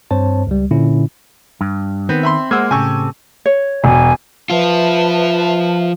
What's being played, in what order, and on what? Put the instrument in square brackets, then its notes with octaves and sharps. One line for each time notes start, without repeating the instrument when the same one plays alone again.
[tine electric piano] G2 C4 C5 C#5 A5
C#2 G3
A#2 D3 C#4 E4
[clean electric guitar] G2
[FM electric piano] D#3 [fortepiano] B3 [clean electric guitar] C4
[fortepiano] E5 B5 C6
[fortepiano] G#3 C5 E6 [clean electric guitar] A#3 [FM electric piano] F#5 G#6
[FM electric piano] A2 C#3 [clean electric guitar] C4 G4 A4 [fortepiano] G#5 C#6
[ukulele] C#5
[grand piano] E1 [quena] G#5
[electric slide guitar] F3 F4 [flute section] B4 E5 A5